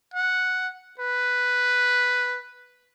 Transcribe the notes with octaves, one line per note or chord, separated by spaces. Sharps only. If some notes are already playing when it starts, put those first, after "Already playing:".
F#5
B4